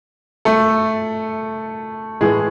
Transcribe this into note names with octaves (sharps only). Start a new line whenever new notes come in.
A3 A4
A2 E3 G#3 G#4